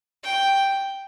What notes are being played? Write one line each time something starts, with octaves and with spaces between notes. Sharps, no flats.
G5